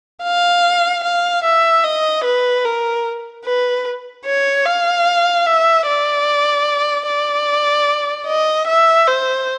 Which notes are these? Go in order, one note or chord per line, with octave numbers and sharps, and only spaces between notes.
F5
F5
E5
D#5
B4
A#4
B4
C#5
F5
E5
D5
D5
D#5
E5
C5